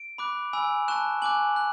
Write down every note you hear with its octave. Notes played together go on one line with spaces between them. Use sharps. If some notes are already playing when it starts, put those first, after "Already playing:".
Already playing: D7
B5 D6 F#6
G#5 B5 E6
A5 C#6 F#6 E7
G#5 D6 F#6 F#7
F#6